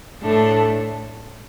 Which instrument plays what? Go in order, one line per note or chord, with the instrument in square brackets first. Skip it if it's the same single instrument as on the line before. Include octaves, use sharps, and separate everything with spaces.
[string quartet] A2 A3 D4 A4